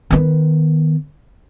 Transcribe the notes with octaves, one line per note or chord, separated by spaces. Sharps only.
D#3 B3